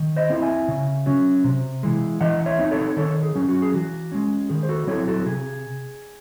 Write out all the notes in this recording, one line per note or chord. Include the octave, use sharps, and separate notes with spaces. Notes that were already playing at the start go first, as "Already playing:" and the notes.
Already playing: D#3
C5 D#5
A3 C4 E4
E5 G#5
C#3
F#3 C#4
C3
E3 G#3
E3 D#5 F#5
C#5 E5
C4 D#4
A4 C#5
D#3 A4 C#5
G#4
F#3 C#4
F#4
G#4
E3 F#4
G#3 C#4
D#3 G#4
C5
F#4 A4
F#3 C4 E4 A4 C#5
F#4 A4
C3 G#4